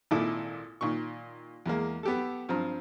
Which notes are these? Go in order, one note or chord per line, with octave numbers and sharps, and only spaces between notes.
G#1 A#2 E4 A4 D6
A#2 D#3 C#6
E2 G#3 A#3
B3 G4 A4
G2 F3 C4 A#5